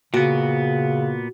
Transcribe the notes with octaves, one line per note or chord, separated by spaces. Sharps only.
A#2 C#3 B3 F#4